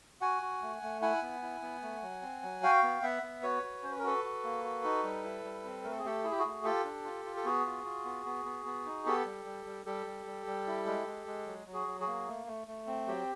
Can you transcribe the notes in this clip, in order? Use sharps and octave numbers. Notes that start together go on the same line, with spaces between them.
F#4 F#5 G#5
F#4
A3
A3
E4 F#5 G#5
B3
E4
B3
A3
F#3
C4
F#3
F#4 F5 G5
B3
B3 E5 F#5
B3
F#4 B4 C#5
F#4
C#4 C5
B4
A#4
F#4 A4 B4
F#4
A#3
F#4
D#4
G3
E4
G3
C4
A3 A#4
A4
G#4
A3 G4 A4
E4 G#4
G4
F#4 G#4
A3
F4 G4 A4
D4
F4
F4
A4
B3 F#4 G#4
F4
F4
B3
B3
B3
B3
D#4
B3 G4 A4
G3
G3
G3
G3 G4 A4
G3
G3
G3
E4
G#3
G#3
G#3
F#3
F#3
F#4 G#4
F#3
F#4 G#4
A#3
A3
A3
A3
C4
F#3 G4